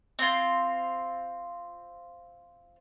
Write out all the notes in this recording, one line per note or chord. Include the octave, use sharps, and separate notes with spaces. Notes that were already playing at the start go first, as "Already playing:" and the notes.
C4 F4